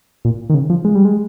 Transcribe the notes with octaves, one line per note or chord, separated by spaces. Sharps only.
A#2
D#3
C#3
F3
G#3
G3
G#3